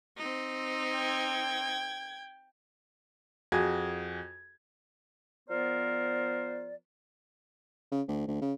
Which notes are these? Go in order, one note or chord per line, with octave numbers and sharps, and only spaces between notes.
C4 D#4
G5 G#6
F2 F#4 G#4 G#5 G#6
F3 B3 A#4 C5 D5
C#3
D2
D2
C#3